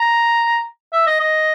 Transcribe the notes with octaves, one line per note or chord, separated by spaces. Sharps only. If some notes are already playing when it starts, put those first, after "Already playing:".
Already playing: A#5
E5
D#5
D#5